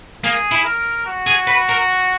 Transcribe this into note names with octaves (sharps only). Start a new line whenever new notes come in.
A#3 G#4
E4
A#4
F#4
G#4
B4
A#4